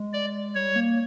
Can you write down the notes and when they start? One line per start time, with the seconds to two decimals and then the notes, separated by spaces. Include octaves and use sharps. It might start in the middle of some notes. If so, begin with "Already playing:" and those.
Already playing: G#3
0.13 D5
0.55 G3 C#5
0.76 A#3